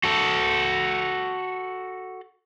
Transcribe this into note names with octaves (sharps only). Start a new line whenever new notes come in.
F#4 A4